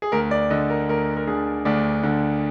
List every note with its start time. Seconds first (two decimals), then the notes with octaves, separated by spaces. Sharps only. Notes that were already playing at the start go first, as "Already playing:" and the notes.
0.02 G#4
0.12 D2 A#4
0.31 D5
0.50 D3 D#5
0.70 A#4
0.89 D2 A#4
1.16 A#4
1.27 D3 G#4
1.65 D2 D4
2.03 D3